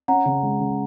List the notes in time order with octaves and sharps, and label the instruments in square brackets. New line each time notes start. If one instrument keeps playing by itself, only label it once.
[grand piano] C#4 [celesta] F#5 A#5
[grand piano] C#3
G#3
C#3